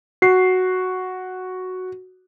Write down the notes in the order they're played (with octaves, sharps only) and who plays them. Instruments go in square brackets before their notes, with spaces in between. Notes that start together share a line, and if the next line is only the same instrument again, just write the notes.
[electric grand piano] F#4 C7